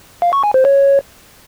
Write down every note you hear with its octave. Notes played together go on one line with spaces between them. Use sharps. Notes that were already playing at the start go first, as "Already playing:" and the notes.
F5
C#6
G#5
C5
C#5